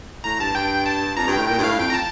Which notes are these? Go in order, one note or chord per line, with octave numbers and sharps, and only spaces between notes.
A2 A#5
G2 A5
G2 G5
A5
F2 A#5
G2
G5
A2
A#2 G5
G2
A2 F5
F2 G5
A#5
A5